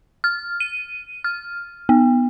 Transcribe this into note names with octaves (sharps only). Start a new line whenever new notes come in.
F6
D#7
F6
B3